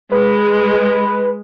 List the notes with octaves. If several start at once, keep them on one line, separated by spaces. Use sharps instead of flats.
G#3 B4